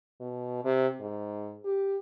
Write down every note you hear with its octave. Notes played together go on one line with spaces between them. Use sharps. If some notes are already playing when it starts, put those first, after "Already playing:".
B2
C3
G#2
G4